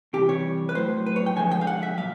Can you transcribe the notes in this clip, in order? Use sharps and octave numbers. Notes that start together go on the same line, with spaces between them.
C3 E3 G3 G4
C#5
B4
A2 F#3 C5
B4
C#5
G5
D3 F3 G#3 G#5
G5
F5
F#5
E5
A#2 F#3 F5